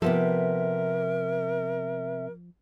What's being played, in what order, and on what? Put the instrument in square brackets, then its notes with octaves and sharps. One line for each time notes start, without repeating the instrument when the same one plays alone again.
[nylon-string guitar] C3 B3 A4 [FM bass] F3 [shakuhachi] A#4 [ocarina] E5